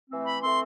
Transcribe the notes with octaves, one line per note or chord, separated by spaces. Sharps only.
E3 A3 C4
B5
E3 A3 C4 C6